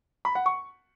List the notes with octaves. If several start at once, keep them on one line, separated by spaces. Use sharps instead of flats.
B5
F#5
C#6